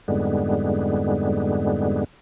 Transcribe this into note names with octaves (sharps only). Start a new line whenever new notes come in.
F2 G#2 D3 G3 G#3 B3